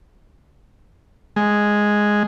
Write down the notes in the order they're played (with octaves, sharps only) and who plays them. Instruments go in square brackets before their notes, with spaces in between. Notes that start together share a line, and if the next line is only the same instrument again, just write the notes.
[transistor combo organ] G#3